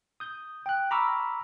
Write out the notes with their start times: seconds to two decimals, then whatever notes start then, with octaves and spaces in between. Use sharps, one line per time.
0.20 D#6 G6
0.66 G5 F#6
0.91 A#5 B5 C#6 D6 E6 F6